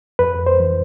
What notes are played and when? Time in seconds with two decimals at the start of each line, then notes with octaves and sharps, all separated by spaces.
0.19 F2 B4
0.46 C5
0.60 E3